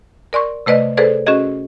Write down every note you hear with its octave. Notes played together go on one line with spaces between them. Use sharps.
A#4 D5 C6 C#6
C3 A3 B4 D5 D#5
G#4 A4 B4 C5 D5
C#4 F#4 G#4 D#5